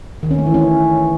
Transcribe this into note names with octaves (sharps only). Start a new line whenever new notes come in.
D#3
C#4
A3
E3
C#4